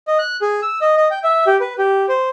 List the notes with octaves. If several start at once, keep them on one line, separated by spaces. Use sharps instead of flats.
D#5
F#6
G#4
E6
D#5
D#5
G5
E5
G4
B4
G4
C5